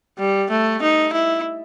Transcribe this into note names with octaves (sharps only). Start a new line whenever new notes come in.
G3
A3
D#4
E4